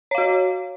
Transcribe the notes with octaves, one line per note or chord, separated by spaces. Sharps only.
F#4 C#5 F5